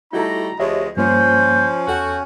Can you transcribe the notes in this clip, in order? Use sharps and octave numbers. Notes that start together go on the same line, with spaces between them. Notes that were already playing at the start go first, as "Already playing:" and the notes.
G3 A3 D#4 E4 F#4 A4 A#5
D2 F3 G#3 G4 C#5 D#5 E5
G2 F3 A#3 C#4 C5 G6
E2 F#4 A4 F#5 G5